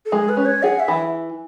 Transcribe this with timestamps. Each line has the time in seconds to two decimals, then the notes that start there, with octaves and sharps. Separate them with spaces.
0.06 A4
0.12 G#3 G#4
0.29 B4
0.37 C#4
0.45 C#5
0.63 G#4 F#5
0.80 E5
0.88 E3